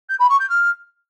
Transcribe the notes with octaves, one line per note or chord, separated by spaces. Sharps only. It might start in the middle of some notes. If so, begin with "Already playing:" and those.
G6
B5
C#6
G6
F6